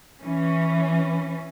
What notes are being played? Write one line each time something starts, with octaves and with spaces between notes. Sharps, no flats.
E3 C#4